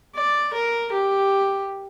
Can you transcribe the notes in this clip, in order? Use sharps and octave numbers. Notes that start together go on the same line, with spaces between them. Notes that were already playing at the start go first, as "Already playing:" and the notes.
D5
A#4
G4